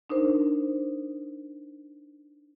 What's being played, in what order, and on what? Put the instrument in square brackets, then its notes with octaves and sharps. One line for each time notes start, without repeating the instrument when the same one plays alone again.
[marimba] D4 D#4 A#4 C5